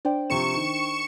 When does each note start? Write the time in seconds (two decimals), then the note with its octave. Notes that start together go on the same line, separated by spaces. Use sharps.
0.05 D4 C5 D5 G5
0.30 C3 F3 C4 C#6 C#7 E7
0.55 D#3